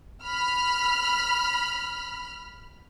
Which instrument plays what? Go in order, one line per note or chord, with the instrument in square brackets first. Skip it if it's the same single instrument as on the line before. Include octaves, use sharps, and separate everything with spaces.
[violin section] B5 F6